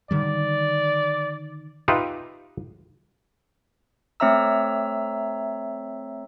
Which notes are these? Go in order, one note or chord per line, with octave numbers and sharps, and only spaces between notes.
D3 D#3 G3 D5
D#4 F4 G4 B4 E5
A3 C4 C#5 E5 A#5 E6